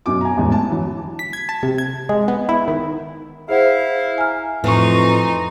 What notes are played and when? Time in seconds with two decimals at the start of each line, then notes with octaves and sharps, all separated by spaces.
0.06 F#2 B2 D6
0.21 G#5 A#5
0.37 A1 E2 G#2
0.52 A5
0.70 E3 F#3
1.19 B6
1.33 G#6
1.49 A5
1.63 C3
1.78 G#6
2.09 G#3
2.28 B3
2.49 E4
2.68 D#3
3.49 E4 G#4 C5 F5 F#5
4.18 G#5 A#5 F6
4.64 F2 A2 E3 D#4 C6 C#6